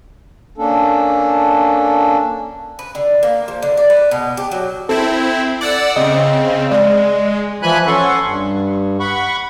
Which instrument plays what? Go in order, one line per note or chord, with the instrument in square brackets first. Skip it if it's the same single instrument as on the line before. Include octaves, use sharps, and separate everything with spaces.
[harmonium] A#3 C#4 D4 A4
[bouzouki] B4
D3
A#3
F3
D3
D5
B4
B2
G4
F#3
[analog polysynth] C4 E4 [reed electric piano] A4
[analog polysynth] D5 F#5 E6
[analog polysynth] C#3 C4 [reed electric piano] D#5
[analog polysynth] G#3 [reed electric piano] D5
[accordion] E3 F3 G#5 B5 F#6
C#4 A4 F#5 C6 C#6
G2
F#5 B5 C#6